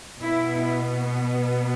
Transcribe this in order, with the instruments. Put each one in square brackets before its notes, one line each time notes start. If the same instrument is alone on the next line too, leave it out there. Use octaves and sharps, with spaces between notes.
[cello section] B2 B3 E4